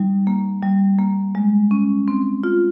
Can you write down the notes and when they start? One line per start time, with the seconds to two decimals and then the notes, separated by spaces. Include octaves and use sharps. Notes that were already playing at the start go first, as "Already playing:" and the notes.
Already playing: G3 D#4
0.27 A#3
0.63 G3
0.99 A#3
1.35 G#3
1.71 C#4
2.08 C4
2.44 F4